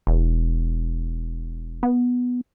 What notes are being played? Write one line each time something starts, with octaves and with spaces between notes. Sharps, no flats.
E1
B3